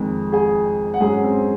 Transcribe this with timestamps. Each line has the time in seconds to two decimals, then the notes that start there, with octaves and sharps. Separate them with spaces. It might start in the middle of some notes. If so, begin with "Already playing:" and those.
Already playing: F2 D#3 G#3 G#4 G#5
0.32 G#4 G#5
0.94 F#5
1.00 G#2 F#3 C#4 G#4 G#5
1.24 C4 C5